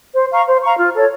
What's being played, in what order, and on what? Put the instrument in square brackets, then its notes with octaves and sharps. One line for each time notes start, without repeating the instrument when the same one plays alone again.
[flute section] C5
F5 A#5 C#6
C5
F5 A#5 C#6
F4
A4 C#5